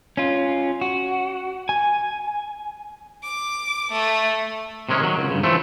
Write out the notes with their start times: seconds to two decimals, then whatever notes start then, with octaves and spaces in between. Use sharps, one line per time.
0.17 C#4 F4
0.81 F#4
1.69 G#5
3.23 D6
3.92 A3
4.89 C3 D#3 G#3 C#4
5.01 D#3 F#3
5.17 C#2
5.31 G2 C#3
5.44 E3 F3 A3 C4